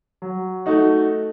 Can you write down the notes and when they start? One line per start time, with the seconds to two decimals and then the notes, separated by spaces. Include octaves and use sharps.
0.22 F#3
0.66 A3 D#4 F#4